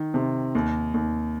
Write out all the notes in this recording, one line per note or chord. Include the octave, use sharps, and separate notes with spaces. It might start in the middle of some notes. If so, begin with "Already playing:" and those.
Already playing: D#3
C3
D#2
D#2